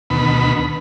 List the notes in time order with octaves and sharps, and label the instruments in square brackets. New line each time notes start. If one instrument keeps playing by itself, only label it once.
[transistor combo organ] D2 B2 D#3 B5